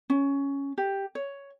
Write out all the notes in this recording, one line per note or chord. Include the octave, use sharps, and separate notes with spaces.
C#4
G4
C#5